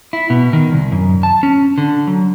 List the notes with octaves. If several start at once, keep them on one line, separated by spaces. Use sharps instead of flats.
E4
B2
D#3
C2
F#2
A5
C#4
D3
F#3